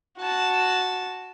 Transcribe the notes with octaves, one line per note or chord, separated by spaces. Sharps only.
F#4 A5